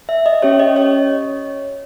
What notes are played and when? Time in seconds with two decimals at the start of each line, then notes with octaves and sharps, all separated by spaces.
0.09 E5
0.26 D#5
0.42 C#4 G4 C#5
0.60 D#5
0.76 C#5